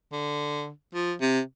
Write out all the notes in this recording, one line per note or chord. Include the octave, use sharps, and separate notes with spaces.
D3
F3
C3